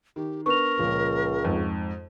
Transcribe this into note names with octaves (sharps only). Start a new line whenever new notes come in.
D#3 G4
B3 D4 A#4 B4 C#6 F7
C#2 A#2 F3
F2 G#2